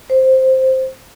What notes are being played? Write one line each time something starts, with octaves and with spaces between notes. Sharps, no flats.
C5